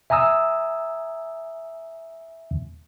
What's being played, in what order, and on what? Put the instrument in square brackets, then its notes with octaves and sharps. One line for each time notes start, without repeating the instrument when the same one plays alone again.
[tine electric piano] E5 G#5 A#5 D#6 E6